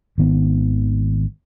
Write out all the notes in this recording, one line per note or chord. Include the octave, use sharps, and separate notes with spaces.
G#1 D#3 B3